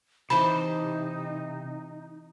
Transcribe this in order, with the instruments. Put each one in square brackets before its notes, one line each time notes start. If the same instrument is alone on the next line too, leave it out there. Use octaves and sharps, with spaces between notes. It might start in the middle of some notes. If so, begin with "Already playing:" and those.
[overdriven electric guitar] C3 [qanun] E3 C5 A5 [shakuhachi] D#4 [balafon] B5